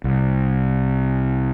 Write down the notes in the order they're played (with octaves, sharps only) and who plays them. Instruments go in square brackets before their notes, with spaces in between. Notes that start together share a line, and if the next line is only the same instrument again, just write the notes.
[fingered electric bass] C2